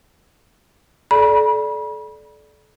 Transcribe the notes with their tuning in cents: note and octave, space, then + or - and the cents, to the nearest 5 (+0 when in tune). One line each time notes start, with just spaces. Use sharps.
A4 -30 D5 +0 B5 -40